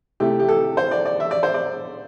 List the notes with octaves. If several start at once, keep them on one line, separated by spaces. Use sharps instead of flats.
C3 A3 E4 G4
G4
A4
C5
D5
D5
E5
D5
C5
D5